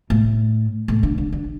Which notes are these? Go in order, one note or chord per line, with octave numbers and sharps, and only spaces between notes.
A2
A2
D3
D3
D3